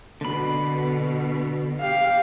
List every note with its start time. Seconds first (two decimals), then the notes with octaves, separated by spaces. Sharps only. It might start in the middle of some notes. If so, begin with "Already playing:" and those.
0.21 B2 D3 B5
1.80 G4 F5